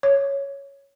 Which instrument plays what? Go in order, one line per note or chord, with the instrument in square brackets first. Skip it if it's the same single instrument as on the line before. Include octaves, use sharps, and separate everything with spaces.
[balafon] C#5